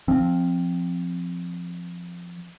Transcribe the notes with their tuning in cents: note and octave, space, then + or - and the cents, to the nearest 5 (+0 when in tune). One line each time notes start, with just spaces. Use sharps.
F3 +0 C4 +0